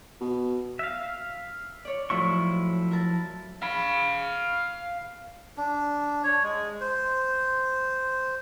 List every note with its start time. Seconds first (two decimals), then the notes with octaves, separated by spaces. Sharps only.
0.21 B2
0.79 E5 F5
1.85 C#5 D5
2.10 A2 F3 F#3 E4 F4 C#6
2.91 A#4 E5 A5
3.62 F5 B5
5.58 D4
6.24 C#5
6.43 G#3
6.81 C5